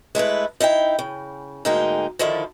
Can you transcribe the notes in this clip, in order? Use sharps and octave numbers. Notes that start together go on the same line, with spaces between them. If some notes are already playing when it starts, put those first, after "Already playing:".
G#3 A3 E4 B4
D#4 E4 F5 G5
C#3
D2 G#2 G#3 A#3 D#4 G5
D3 D#3 F3 E4 A4